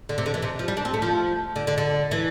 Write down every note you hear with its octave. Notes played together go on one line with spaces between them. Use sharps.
D3
C3
D3
E3
C3
F3
G3
D4
C4
A3
F3
D3
D3
D3
E3